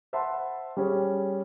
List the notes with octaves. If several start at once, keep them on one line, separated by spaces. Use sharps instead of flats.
C5 E5 F#5 A5 B5 C6
G3 C#4 G#4 C#5